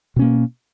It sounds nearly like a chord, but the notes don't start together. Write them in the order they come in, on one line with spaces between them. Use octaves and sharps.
B2 C#4 A#3